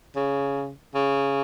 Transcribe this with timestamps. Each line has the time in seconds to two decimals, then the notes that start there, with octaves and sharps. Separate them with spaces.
0.16 C#3
0.95 C#3